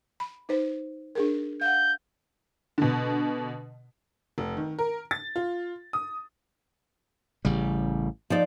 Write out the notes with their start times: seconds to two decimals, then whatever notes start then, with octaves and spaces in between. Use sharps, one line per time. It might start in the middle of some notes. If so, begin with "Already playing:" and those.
0.20 B5
0.49 D#4 B4 C5
1.15 D4 G#4 A#4
1.61 F5 F#5 G6
2.78 B2 D3
4.38 F1
4.57 D#3
4.79 A#4
5.11 A6
5.36 F4
5.93 D#6
7.45 A1 C#3 G3
8.30 F3 D#4 D5